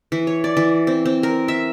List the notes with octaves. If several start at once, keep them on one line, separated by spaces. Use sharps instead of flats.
E3
C#5
D5
E3
C4
C4
A#4
E5